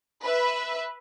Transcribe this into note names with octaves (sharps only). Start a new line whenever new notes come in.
B4 E5